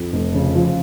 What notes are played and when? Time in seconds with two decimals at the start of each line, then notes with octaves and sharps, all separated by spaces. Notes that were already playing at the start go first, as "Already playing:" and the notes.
Already playing: F2
0.13 F1
0.34 C#3
0.55 F3